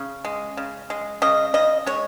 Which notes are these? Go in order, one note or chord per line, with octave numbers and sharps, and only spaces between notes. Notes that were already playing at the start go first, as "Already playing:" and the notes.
Already playing: C#3
G#3
C#3
G#3
C#3 D#5
C#3 D#5
G#3 C#5